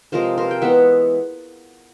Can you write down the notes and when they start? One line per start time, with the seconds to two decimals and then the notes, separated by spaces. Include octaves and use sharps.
0.12 C3 F3 G#3 A#4 C5
0.37 A#4 C5
0.51 G5
0.62 E3 G#3 B3 E5 F#5